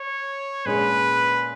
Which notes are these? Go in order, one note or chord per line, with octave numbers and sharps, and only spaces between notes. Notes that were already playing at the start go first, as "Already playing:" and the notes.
Already playing: C#5
A#2 G#3 C#4 G#4 B4